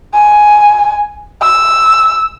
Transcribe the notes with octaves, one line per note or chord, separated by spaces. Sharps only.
G#5
E6